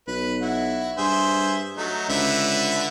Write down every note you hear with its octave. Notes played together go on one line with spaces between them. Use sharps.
B1 B4
E4 F#4
G2 G#4 C5 E5
F#3 A3 D#4
C#2 D3 B4 E5